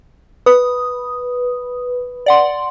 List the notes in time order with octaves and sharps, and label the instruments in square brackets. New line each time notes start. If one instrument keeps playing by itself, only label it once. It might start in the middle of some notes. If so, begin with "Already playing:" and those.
[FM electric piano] B4 [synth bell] D#6
[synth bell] D5 F#5 C6